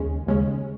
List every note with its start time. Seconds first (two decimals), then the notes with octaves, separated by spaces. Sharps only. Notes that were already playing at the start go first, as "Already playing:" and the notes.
Already playing: D#2 C#3 G#3 C#4
0.27 D#2 C#3 G#3 C#4